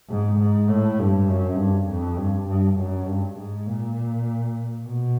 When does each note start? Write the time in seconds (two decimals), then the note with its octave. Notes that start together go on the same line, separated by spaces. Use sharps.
0.10 G#2
0.39 G#2
0.69 A2
0.99 G2
1.28 F#2
1.58 G2
1.88 F2
2.18 G2
2.48 G2
2.78 F#2
3.07 G2
3.38 G#2
3.67 A#2
4.87 B2